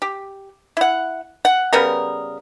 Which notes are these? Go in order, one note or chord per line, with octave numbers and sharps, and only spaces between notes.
G4
E4 F#5
F#5
C#3 G3 B3 A#4